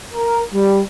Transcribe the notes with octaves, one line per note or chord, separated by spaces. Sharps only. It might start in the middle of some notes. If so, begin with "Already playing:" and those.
A#4
G3